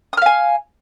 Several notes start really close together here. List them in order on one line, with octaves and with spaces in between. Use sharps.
D#6 F6 F5 G#5